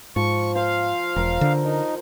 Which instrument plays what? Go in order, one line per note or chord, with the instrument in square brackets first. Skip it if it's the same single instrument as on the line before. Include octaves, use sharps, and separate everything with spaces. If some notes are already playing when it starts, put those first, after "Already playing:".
[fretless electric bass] G#2 [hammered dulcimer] F3 [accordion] C#6
[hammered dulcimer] C5 [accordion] F5
[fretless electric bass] E1 [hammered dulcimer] A#4
[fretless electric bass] D3
[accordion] D#3